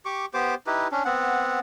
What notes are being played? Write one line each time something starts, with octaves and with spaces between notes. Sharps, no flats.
G4 C#6 D6
B3 G4 C5 D6
D#4 E4 G4 B4
C#4 D4
B3 C4 F#5